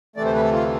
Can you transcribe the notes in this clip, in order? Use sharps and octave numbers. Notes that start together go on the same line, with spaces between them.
D2 C3 E3 A3 D5
C5
B4
A4
F4